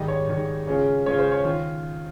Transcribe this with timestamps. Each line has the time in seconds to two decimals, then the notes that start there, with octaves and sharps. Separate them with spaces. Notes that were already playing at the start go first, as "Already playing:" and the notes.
Already playing: G#2 D#3 G3 D#4 D#5
0.08 C#5
0.27 G#2 D#3 G3
0.67 C#3 G#3 C#4 F4
1.06 C#3 G#3 C#4 F4 C#5
1.19 C5
1.32 C#5
1.45 D#3 F4